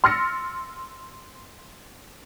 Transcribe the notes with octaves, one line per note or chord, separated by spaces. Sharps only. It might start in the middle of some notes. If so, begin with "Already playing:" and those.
C6 E6 F6 A6 A#6 C#7